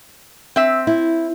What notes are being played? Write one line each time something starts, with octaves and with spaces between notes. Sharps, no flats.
C4 E5
E4